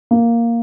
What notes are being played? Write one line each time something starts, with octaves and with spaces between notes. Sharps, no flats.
A#3